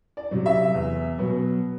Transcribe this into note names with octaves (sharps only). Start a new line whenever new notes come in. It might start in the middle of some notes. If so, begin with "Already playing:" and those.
D5
C3 F#3
E5
E2
B2 F#3 B3